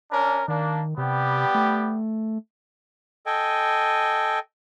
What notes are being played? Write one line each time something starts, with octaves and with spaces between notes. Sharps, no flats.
C#4 D4 A#4
D#3 A#3 D4
C3 G3 B3 G4
A3
A4 D#5 G5 G#5